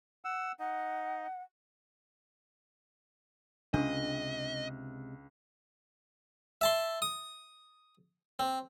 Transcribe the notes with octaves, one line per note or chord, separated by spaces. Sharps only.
F#5 E6
D#4 D#5 F#5
C#2 C3 G#3 D4 D#5 C#6
E5 A5 C6
D#6
C4